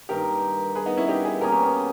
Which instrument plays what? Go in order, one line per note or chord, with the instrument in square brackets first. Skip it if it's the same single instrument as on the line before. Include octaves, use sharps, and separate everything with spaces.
[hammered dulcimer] G2 D#3 A#3 [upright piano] G4 A#4
[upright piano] G#4 B4
B3 D#4
C#4 E4
D#4 G4
E4 G#4
[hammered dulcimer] B2 A#3 C#4 G#4 [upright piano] G4 A#4
[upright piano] G4 A#4
B3